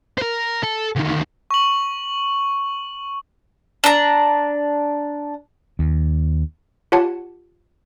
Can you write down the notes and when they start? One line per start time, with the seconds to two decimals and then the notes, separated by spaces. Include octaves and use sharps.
0.18 A#4 C5
0.63 A4
0.96 D2 D#3
1.51 C#6 F#7
3.84 D4 A#5
5.79 D#2
6.92 F4 G4 C#5 F#5 A5